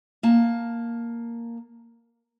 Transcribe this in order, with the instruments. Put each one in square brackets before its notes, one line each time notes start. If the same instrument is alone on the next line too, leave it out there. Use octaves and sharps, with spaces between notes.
[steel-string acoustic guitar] A#3 A5